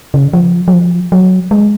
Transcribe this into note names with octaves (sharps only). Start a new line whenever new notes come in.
C#3
F3
F#3
F3
F#3
G#3